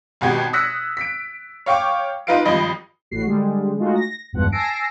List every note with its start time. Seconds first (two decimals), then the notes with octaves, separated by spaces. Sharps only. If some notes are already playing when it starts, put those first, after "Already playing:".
0.21 G#1 B2 F#4 G4 G#6
0.53 D#6 E6 F#6 A#6 B6 C#7
0.97 B6 D7
1.66 C#5 F5 G5 C#6 D6
2.27 D#4 F4 B4 F5 C7 D7
2.45 G#1 G2 F3 D#5 B5 A#6
3.11 A1 A2 F#4 C7
3.24 D3 G3 G#3
3.77 G#3 A3 D#4 F4 F#4
3.95 A#6
4.33 G#1 E2 G2 F3 F#5
4.52 G#5 A5 E6 A#6 C7 D7